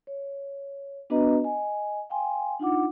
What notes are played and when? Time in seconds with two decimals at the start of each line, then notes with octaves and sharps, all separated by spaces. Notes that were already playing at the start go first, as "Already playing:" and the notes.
0.07 C#5
1.10 B3 D4 F#4 B4 D#5 A#5
1.41 D#5 G#5
2.10 F5 G5 G#5 C6
2.60 D4 D#4 F4 F#5 D6